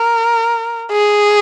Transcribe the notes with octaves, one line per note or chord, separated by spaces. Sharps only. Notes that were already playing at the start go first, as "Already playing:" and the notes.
Already playing: A#4
G#4